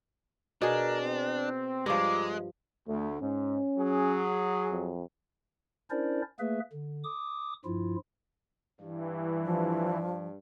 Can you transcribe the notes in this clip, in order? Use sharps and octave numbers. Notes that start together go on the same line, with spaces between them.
B2 D4 G#4 A#4 A#5
C4
G2 F3 G#3 F5 A#5 D6
D2 A3
G#2 C#4
F#3 G#4
F2
C#4 D4 E4 A#4 C5 D5
A3 A#3 G#4 B4 E5
D3
D6 D#6
G2 F3 E4 F4
G2 E3
F3